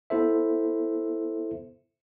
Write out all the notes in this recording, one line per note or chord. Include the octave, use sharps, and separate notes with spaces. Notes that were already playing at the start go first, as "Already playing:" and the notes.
B3 E4 A4 C5 E5